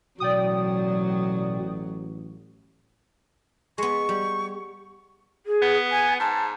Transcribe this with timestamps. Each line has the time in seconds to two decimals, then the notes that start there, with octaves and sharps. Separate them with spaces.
0.20 A1 B2 F#3 D5 G5 D#6
3.78 G#3 B3 C#6
4.09 G3
5.46 G#4
5.62 B3
5.90 G#5
6.20 G#2 A5